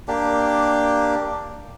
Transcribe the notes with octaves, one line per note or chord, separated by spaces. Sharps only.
A#3 D4 G4